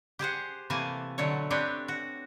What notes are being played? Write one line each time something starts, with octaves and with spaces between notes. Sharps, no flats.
G4 G#4 C5 F#5
C3 E3 A3 A#3 G#5 A5
B2 D3 F#3 A3 C#5
C4 D4 G4 B4 C#5
F#4